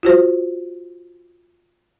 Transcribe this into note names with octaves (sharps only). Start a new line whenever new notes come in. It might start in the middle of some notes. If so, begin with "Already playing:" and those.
F4 F#4 C5